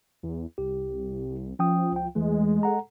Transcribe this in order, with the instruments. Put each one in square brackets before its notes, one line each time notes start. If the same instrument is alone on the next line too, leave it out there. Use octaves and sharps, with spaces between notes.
[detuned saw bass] E2
[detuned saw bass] C2 [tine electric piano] G4
[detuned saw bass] F3 [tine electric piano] C#4 G5 D#6
[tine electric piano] C#2 G5
[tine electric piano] E2 E3 A3 [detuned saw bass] G#3
[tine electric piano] A4 F#5 A#5